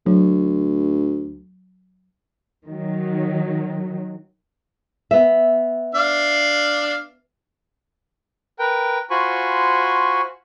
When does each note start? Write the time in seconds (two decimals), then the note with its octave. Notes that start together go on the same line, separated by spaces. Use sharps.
0.06 D2 F#3
2.66 D#3 F#3
5.11 B3 E5
5.95 D4 F5
8.59 A#4 B4 G5
9.10 F4 F#4 C5 G#5 B5 C#6